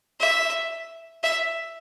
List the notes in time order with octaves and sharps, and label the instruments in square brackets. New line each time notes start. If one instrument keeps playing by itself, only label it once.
[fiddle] E5
E5